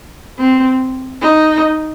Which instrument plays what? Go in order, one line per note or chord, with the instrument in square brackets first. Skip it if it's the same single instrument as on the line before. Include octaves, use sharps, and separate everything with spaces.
[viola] C4
D#4